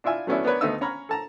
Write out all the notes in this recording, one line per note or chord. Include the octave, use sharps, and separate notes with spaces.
D4 E4 F4 E5 G#5
F#3 A3 B3 C#4 D4 E4
B3 D4 A#4 B4 C#5
D2 A3 B3 D#4 D#5 E6
C#4 C#5 A#5 B5 F6
A4 A5 A#5